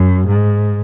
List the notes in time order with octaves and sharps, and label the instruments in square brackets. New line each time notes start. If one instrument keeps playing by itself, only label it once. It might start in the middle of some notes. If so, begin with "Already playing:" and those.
Already playing: [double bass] F#2
G#2